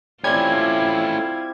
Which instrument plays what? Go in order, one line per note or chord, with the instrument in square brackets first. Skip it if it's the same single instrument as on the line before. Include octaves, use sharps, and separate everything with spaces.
[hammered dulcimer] G3 C4 [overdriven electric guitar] A3 C#4 [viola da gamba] E4 F4 [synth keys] G#6